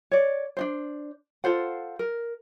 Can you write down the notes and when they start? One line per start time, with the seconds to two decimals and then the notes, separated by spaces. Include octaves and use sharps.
0.11 C#5 D5
0.57 D4 D#4 C5
1.44 F4 A4 C5 F#5
1.99 A#4